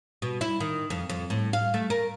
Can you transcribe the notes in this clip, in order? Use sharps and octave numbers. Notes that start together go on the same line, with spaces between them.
B2
E4
D#3
F2
F2
A2
F5
A3
A#4